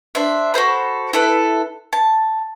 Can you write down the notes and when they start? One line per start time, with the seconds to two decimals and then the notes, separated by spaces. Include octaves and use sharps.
0.15 D4 C5 E5
0.54 F#4 A4 C5 B5
1.13 E4 A4 B4
1.93 A5